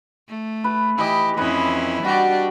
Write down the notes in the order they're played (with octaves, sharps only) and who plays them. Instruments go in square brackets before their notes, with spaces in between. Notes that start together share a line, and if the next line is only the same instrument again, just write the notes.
[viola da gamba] A3
[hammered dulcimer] B4
[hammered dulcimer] E3 D#5 [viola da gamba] E4 G4
[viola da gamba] F2 C#4 E4 [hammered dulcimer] B4
[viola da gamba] G3 D4 G4 [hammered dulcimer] F#4